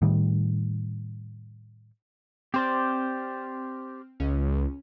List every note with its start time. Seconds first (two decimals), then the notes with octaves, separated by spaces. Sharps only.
0.02 A2 D#3 G3
2.54 C4 G4 C5 D5 F6
4.20 C#2 C#4